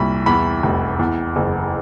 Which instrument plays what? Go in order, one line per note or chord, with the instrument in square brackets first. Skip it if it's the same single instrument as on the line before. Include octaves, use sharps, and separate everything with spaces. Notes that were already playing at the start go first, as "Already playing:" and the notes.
Already playing: [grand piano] C2 A#2 B5
E2 B5
F1
E2
F#1